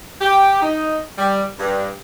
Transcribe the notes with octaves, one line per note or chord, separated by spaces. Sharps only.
G4
D#4
G3
G2